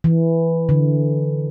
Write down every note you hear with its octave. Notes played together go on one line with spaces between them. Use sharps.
E3
D3